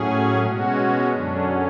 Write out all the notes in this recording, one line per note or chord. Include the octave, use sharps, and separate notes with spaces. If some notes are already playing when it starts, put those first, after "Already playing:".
Already playing: A2 F#3 C#4 G#4
B2 G#3 C#4 F#4
F#2 D3 F#3 C#4 D4